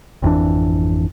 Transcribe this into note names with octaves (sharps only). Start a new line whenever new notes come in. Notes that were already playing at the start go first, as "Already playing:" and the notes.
G#1 F2 E3 D4